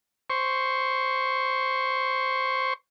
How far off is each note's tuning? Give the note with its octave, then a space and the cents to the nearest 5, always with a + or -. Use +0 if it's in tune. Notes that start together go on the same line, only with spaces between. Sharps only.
C5 +0 C#6 +0